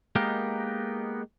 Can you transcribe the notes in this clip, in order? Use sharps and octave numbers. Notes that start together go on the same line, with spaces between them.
G#3 A#3 B3 D#4 G4 A#4